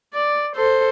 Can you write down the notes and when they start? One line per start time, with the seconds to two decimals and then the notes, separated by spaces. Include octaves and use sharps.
0.13 D5
0.55 A4 C5